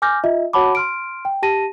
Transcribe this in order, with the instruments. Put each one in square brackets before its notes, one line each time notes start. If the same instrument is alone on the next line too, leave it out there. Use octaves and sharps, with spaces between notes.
[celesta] G#5 D6 F6 G6 A#6
F4 D#5 E5
F#4 C#5 F#5 A5 B5 D6
C6 F6 D7
G5
G4 A5 A#6 D#7